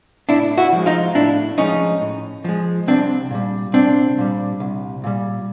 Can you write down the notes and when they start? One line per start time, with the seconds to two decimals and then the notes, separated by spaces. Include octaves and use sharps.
0.29 A2 D4 E4
0.57 E4 F#4
0.73 F3 G#3
0.86 D#4 F4
1.15 A2 D4 E4
1.58 F3 G#3 C#4 D#4
2.01 A2
2.44 F3 G#3
2.87 C2 C4 D4
3.31 A#2 G3
3.73 C2 C4 D4
4.18 A#2 G3
4.60 C2
5.04 A#2 G3